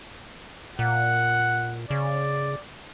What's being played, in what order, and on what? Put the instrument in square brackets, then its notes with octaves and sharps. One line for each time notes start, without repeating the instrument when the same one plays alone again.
[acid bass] A#2 [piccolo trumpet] F#5
[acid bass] C#3 [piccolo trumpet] D5